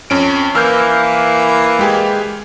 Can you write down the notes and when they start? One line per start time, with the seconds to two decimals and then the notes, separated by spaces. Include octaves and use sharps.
0.10 F2 C#4 D7
0.55 E3 A#3 E6 F6 G6
1.79 G#3 G4 G#4